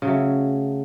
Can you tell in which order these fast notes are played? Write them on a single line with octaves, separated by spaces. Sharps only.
C#3 F#3 A3